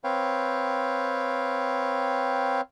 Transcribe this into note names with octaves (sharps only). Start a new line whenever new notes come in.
C4 B4 C#5 F5 G5